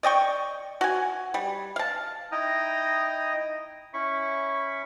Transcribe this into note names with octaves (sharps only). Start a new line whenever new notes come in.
D5 D#5 G5 C#6
F#4 G#5
G3
F5 A5
D#4 E4 D#5 G5 A#5 D#6
C#4 E4 B5 C#6